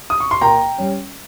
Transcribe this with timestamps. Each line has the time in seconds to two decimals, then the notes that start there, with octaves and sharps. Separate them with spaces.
0.10 D#6
0.20 C#6
0.31 C6
0.41 A#2 G5 A#5
0.78 G3 C#4